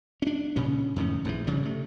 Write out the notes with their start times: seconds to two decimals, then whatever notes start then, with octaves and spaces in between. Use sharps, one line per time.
0.22 C#4 D4
0.56 D2 A#2 C#3 C#4
0.96 F2 A2 D#3 C#4
1.25 A#1 G#2 C#3 E3
1.47 G#1 C#3 F3 G3
1.63 C3 A3